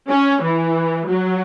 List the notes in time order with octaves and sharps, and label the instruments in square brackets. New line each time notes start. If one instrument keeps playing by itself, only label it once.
[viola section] C#4
E3
F#3